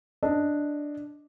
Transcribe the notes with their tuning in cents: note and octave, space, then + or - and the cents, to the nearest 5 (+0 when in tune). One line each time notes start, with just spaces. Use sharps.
D4 +0 D#5 +0